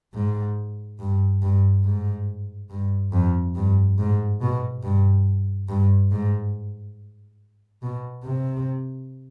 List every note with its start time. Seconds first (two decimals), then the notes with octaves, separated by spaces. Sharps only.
0.14 G#2
0.99 G2
1.42 G2
1.84 G#2
2.70 G2
3.12 F2
3.55 G2
3.98 G#2
4.41 B2
4.83 G2
5.68 G2
6.11 G#2
7.82 B2
8.24 C3